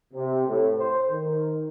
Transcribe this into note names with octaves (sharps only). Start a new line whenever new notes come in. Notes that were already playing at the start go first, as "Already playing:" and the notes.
C3
A2
C5
D#3